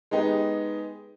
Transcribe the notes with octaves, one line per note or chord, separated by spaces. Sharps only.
G#3 B3 D#4 G4